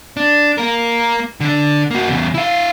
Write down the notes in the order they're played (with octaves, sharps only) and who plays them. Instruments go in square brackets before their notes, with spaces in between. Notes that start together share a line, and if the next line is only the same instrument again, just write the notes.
[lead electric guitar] D4
A#3 A#4
D3 D4
A#3 F#4
E2 C#3
E4 F5